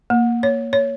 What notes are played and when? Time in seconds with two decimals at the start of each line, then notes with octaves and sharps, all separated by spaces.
0.10 A#3
0.43 C#5
0.73 C#5